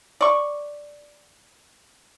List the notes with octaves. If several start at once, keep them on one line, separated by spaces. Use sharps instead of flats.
D5 C#6